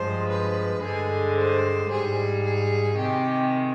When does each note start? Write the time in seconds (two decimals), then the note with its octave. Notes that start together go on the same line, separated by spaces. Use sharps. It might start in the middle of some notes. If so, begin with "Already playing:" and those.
Already playing: G2 F3 G#3 C5
0.29 B4
0.81 G2 D3 G#3 G#4
1.36 C5
1.90 G#2 G3 G#4
2.43 G#4
2.97 C3 D#3 G#3 G4